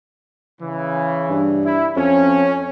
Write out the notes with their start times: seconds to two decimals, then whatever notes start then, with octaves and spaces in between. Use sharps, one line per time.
0.61 C#3 E3
1.29 G2
1.65 E4
1.96 F2 C#4